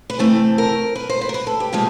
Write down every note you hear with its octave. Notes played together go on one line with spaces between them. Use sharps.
B4
C3 E3 A3 C4 A4
A#4
B4
C5
B4
A#4
B4
A4
G4
A#2 F3 G#3